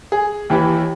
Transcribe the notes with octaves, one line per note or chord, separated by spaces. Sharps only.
G#4
D#2 E3 G4